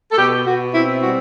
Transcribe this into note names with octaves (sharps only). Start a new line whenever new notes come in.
A4
B2 G4
B2 F#4
C4 E4
G3 F#4